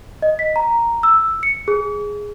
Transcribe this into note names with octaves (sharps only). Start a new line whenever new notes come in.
D#5
B6
A#5
E6
C#7
G#4